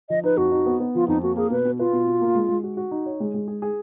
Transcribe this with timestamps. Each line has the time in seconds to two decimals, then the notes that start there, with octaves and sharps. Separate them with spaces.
0.09 F3 D#5
0.24 D#4 B4
0.37 F2 F#4
0.51 D#4
0.66 B3
0.80 B3
0.95 F3 F4
1.08 F2 D#4
1.22 A#3 F#4
1.36 A#3 G#4
1.50 B2 B4
1.65 B2
1.79 F4 B4
1.93 B2
2.07 B2
2.21 A#3
2.35 G#3
2.49 G#3
2.63 F#4
2.77 F#4
2.91 D#4
3.06 C#5
3.20 G#3
3.34 G#3
3.48 G#4
3.62 G#4